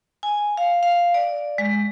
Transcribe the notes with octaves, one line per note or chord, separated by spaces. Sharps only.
G#5
F5
F5
D5
G#3